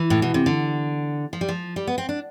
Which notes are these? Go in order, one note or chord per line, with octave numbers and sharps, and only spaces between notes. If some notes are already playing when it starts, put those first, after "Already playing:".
Already playing: E3
A2
B2
C3
D3
F3
G3
F3
G3
B3
C4
D4